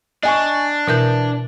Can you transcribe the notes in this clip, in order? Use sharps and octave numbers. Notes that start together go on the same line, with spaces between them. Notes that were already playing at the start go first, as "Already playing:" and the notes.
D4 D#5 G#5 C#6
B2 E3 A#4 G6